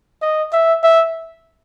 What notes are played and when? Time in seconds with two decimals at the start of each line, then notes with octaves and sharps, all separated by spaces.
0.22 D#5
0.53 E5
0.83 E5